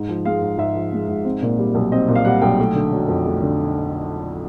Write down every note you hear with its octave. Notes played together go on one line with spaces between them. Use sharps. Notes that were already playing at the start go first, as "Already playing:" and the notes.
Already playing: G#2
F3
G#3 F5
G#2
G#2 E5
F3
G#3
G#2
C4
A#2
G3
B1
C4 D#5
A#2
F5
G3 F#5
B1 G5
A3
D3
F#3
F2
A3
D3